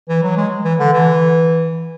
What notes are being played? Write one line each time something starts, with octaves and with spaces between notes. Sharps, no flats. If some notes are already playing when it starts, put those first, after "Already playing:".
E3
F#3
G#3
E3
D3
E3